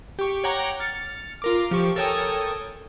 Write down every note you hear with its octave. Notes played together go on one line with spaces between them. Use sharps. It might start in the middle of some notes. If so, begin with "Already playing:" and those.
G4 C#6
C#5 F#5 G5 A#5 D6
F6 A6 C#7
F4 A#4 D6
F3 G4 C#6
A4 A#4 C#5 G5 G#5 D#6